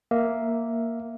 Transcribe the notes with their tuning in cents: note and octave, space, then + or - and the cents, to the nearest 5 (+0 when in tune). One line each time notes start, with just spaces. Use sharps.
A#3 +0 E5 +0